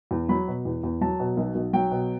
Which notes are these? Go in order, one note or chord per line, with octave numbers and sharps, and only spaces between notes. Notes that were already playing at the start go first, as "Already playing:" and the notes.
E2
F#3 B5
B2
E2
E2
F#3 A5
B2
B1
B1
F#3 G5
B2